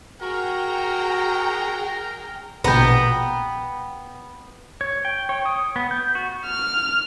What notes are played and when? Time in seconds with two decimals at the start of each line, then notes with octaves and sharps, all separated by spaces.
0.22 F#4 G#4 A#4 G5 A#5
2.64 A#1 B2 B3 G5 A#5
4.81 C#5
5.05 G5
5.29 C#5
5.46 D#6
5.76 B3
5.91 G6
6.15 F#4
6.47 F6